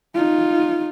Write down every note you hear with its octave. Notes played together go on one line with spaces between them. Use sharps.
D#4 F4